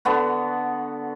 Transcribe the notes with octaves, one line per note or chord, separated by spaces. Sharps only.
D3 B3 F#4